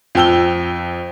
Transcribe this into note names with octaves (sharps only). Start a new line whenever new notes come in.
F2 F3 G5 E6 G7